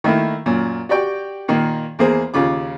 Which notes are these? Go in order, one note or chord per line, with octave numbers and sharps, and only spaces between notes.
D#3 A3 A#3 E4
F#2 A#2
F#4 G4 D5 G5
A#2 D#3 A#3
E2 A#3 G#4 C5
D#2 C#3 F4 D6